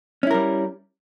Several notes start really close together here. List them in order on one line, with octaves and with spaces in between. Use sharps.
C#4 E4 A#4 G3